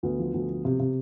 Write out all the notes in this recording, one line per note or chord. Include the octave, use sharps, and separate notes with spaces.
D2 B3
F3
D2
F3
C3
C3